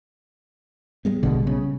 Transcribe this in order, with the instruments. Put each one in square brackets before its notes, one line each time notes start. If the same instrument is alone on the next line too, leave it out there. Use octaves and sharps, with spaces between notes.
[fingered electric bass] G3 G#3 B3
[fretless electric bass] A#1 B2 D3
C#3